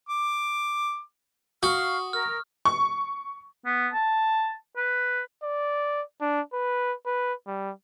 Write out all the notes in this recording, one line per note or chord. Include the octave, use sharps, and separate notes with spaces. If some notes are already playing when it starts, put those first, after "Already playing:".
D6
F#4 F5 C#6 D#6 F6
A#4 F6
C#6
B3
A5
B4
D5
D4
B4
B4
G3